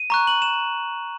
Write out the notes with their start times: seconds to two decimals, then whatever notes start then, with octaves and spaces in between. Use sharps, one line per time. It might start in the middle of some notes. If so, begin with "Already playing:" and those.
Already playing: D#7
0.10 A#5 C#6 F#6
0.27 F#7
0.42 E7